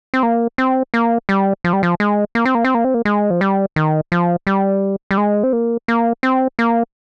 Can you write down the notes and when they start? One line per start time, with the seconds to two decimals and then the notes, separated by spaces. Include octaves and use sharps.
0.14 C4
0.23 A#3
0.58 C4
0.94 A#3
1.29 G3
1.64 F3
1.73 G3
1.83 F3
2.00 G#3
2.35 A#3
2.45 C4
2.55 A#3
2.65 C4
2.75 A#3
2.84 C4
2.94 A#3
3.05 G#3
3.30 F3
3.41 G3
3.76 D#3
4.12 F3
4.47 G3
5.11 G3
5.18 G#3
5.43 C4
5.53 A#3
5.88 A#3
6.23 C4
6.59 A#3